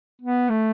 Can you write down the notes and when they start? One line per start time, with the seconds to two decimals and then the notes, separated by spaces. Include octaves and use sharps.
0.21 B3
0.49 A3